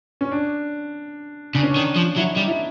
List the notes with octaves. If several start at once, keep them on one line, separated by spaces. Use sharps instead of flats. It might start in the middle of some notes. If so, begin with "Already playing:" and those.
C#4
D4
C#3 D4
C#4
D4
D#3
F3
F#3 E4
D#4
G3
E4